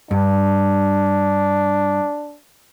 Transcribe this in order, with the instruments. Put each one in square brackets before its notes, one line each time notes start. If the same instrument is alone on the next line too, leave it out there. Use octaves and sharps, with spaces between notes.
[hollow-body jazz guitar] G2 [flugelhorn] D4